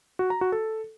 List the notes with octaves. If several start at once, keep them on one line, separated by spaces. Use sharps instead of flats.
F#4
A#5
F#4
A4